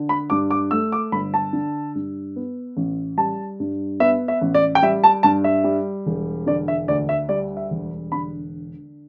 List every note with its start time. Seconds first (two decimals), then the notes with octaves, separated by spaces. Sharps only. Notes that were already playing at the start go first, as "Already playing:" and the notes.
Already playing: D3
0.09 B5
0.30 G2 D6
0.51 D6
0.71 A3 E6
0.92 D6
1.12 G1 B5
1.34 A5
1.53 D3
1.95 G2
2.36 B3
2.77 A1
3.17 G3 A5
3.60 G2
4.00 B3 E5
4.28 E5
4.41 A1
4.54 D5
4.75 G5
4.82 G3 E5
5.04 A5
5.23 G2 A5
5.44 E5
5.64 G3
6.06 E1
6.46 D3 D5
6.68 E5
6.88 D2 D5
7.09 E5
7.29 G3 D5
7.57 E5
7.71 E1
8.12 D3 B5